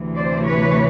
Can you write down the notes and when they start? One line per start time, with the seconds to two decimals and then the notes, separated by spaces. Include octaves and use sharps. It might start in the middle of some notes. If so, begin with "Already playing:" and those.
Already playing: D2 C3 E3
0.16 C5 D5
0.45 B4 C#5